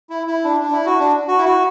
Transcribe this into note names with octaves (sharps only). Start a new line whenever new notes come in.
E4
E4
D4
D4
E4
F#4
D4
F#4
E4
F#4